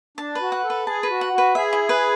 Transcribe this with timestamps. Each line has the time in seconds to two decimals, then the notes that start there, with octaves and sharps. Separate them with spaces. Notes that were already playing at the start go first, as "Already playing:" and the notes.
0.18 D4 A5
0.35 B4
0.41 F#4
0.52 F#5
0.63 A4
0.70 B4
0.87 G#4 A5
1.03 B4
1.10 F#4
1.21 F#5
1.33 F#4
1.38 B4
1.55 G#4 E5
1.73 E4
1.89 B4